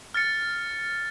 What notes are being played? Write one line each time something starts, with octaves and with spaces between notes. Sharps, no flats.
F6 A6 C#7